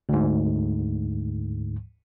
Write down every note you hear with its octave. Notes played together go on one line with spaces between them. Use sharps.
D2 G#2